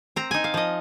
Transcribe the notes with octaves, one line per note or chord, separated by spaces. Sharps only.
C4 A#5
D#4 G#5
F5
F3 D#5